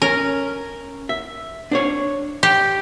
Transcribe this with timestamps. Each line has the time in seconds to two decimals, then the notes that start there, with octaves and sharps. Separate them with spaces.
0.02 C#4 A#4
1.09 E5
1.71 D4 C5 C#5
2.43 G4